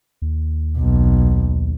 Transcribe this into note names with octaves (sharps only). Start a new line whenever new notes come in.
D#2
B1